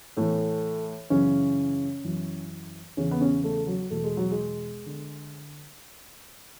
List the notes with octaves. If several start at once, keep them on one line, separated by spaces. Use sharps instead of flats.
A2 E3 A3
F#2 C#3 E3 C#4
F#2 E3
E2 C#3 E3 C#4
B3
C#4
A3
F#3
E2 B2 A3
G#3
F#3
G#3
D3